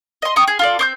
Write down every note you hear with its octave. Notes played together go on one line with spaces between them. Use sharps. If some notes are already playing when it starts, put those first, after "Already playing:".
D#5 C6
G5 A#5 C#6 D#6
G#4
F4 A4 D5
C4 D6 G6